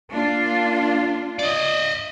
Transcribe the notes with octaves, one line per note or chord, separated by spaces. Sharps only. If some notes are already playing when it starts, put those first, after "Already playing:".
A#3 D4 F4
D5 D#5